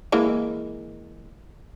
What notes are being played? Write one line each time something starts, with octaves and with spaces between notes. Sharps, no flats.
E3 G#3 A#3